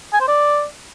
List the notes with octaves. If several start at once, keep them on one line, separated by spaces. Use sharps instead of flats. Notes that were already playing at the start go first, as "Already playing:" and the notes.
G#5
C5
D5